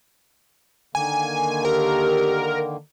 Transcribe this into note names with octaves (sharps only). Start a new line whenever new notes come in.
D3 D#3 A#3 G#5
G4 A#4